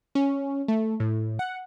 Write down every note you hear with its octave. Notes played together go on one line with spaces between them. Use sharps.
C#4
A3
A2
F#5